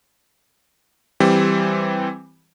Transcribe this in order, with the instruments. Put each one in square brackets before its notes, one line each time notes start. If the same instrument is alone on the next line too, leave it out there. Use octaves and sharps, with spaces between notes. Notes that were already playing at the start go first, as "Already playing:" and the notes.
[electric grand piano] E3 G3 C4